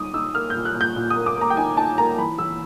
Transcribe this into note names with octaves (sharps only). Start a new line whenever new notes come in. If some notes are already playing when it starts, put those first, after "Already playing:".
Already playing: G3 D#4 D6 D#6
D#4 E6
A#3 F6
A#2 G6
F#6
A#2
G6
A#2
D#6
A#3
D6
A#3 A#5
G5
D#4 G#5
D#4 A5
A#3 A#5
E3 B5
E3 E6